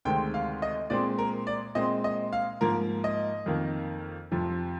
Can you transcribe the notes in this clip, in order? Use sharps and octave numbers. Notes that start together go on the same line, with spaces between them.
D2 C3 D#3 G#3 C4 G5
F5
D#5
A#2 G#3 C4 D5
A#4
D5
A#2 G#3 C4 D#5
D#5
F5
G#2 F3 A#3 A#4
D#5
F2 D#3 A#3
F2 C3 F3